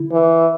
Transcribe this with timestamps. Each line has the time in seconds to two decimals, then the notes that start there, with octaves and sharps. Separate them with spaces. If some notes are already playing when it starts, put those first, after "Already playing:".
Already playing: D3 E4
0.12 E3